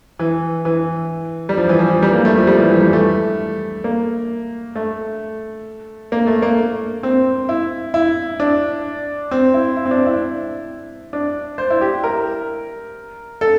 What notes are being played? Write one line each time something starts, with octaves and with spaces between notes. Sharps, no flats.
E3
E3
G3
F3
E3
F3
G3
A#3
A3
F3
G3
E3
E3
G3
A3
A#3
A3
A#3
A3
A#3
C4
E4
E4
D4
C4
E4
E4
C4
D4
E4
D4
C5
E4
G4
A#4
A4